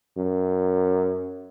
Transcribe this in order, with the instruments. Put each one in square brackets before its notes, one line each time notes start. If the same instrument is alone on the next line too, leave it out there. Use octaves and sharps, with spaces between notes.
[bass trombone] F#2